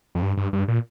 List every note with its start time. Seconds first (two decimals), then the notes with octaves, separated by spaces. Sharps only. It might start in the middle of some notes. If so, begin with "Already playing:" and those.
0.15 F2
0.22 G2
0.37 G2
0.53 G2
0.68 A#2